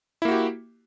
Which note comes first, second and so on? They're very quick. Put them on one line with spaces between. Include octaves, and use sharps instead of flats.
E4 A#3 F#4 G4